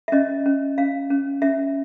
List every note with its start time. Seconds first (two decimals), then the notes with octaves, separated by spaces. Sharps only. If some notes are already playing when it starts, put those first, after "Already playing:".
0.08 E5
0.12 C#4 D#5
0.46 C#4
0.78 C#4 F5
1.10 C#4
1.42 C#4 E5